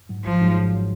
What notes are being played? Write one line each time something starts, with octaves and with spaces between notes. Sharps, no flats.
G#2 F#3
G#1 F3
G#2 F#3
G#1
F#3